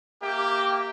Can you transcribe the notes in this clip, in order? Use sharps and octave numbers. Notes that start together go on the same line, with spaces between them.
A#3 G4 E5 G5